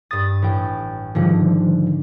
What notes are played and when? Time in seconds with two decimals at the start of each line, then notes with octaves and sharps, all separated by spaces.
0.11 G2 D#6 A6
0.42 A1 G5
1.15 G#2 D3 D#3 F3 G3